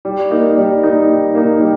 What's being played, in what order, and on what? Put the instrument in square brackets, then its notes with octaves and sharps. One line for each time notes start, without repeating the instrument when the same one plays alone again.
[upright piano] G3
A#3 D#4
G3
A#3 D#4
G3
A#3 D#4
G3